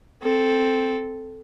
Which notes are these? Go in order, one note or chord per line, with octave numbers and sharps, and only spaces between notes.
C4 A4